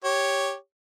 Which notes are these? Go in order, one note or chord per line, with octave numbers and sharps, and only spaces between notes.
G4 C#5